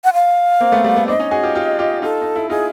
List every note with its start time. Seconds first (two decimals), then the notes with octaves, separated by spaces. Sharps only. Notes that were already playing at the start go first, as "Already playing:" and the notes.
0.04 F#5
0.13 F5
0.61 A#3 C4
0.72 A3 B3
0.84 G3 A3
0.96 A3 B3
1.08 C4 D4 D#5
1.20 C#4 D#4
1.31 F#4 G#4
1.43 F4 G4
1.55 F4 G4
1.79 F4 G4
2.02 D#4 F4 A4
2.22 D#4
2.36 E4
2.50 D#4 F4 G#4